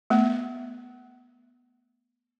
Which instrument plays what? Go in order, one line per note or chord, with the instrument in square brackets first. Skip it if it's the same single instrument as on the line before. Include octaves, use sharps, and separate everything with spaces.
[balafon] A3 B3